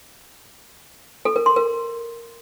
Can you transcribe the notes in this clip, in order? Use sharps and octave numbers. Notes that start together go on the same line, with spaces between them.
A4
A#4
C6
A#4